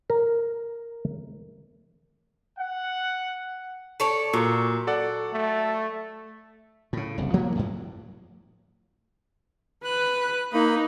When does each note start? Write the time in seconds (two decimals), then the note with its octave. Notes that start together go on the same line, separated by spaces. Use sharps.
0.10 A#4
2.58 F#5
4.00 A4 C#5 D5
4.33 A#2 F#3
4.87 A4 D5 F#5
5.33 A3
6.93 A2 C#3
7.18 F#1 C2
7.33 D#1 F3 A#3 B3
7.56 F#2 A2
9.84 B4 F#6
10.53 A#3 D#4 B5